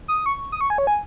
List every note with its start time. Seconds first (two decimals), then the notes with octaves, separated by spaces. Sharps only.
0.08 D#6
0.26 C#6
0.52 D#6
0.61 C#6
0.70 G#5
0.78 C#5
0.87 G#5